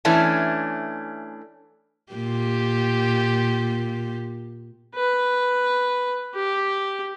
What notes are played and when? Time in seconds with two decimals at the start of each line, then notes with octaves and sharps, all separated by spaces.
0.05 E3 A3 C#4 D4
2.13 A#2 G4
4.96 B4
6.35 G4